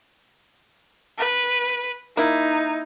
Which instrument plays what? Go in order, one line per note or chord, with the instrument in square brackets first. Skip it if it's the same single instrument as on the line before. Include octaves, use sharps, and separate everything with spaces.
[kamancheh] B4
[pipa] A#3 E4 [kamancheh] D#4